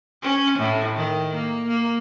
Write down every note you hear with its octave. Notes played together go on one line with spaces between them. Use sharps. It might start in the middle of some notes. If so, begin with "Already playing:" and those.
C#4
A2
D#3
A#3
A#3